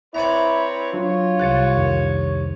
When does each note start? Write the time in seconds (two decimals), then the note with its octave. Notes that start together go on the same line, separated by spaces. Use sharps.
0.14 C4 E4 B4 C#5 D5 A#5
0.93 F#3 D4 F4 C#5
1.39 C2 F#6 A6 C#7
1.75 F2 D#3